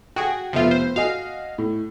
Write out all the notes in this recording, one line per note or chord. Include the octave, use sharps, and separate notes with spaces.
F#4 G#4 G5
F1 F3 B3 F4 E5
C5
F#4 D#5 F5 G#5
A2